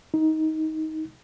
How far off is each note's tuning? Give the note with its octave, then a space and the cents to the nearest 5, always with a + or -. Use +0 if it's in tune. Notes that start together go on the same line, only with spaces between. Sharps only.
D#4 +15